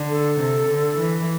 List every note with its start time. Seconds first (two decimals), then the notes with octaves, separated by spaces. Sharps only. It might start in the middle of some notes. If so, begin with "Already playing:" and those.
Already playing: D3
0.10 A4
0.39 C3
0.68 D3
0.97 E3